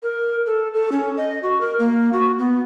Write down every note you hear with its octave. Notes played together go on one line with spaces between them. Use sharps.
A#4
A4
A4
C#4
D#5
F#4
A#4
A#3
F#4
B3